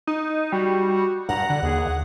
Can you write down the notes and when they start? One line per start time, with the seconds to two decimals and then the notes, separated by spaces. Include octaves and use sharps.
0.07 D#4
0.52 G3 F#4
1.29 G2 F#5 A#5
1.49 D3
1.63 D#2 G#4